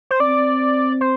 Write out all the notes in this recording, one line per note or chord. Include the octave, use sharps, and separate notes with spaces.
C5
C4 D5
C5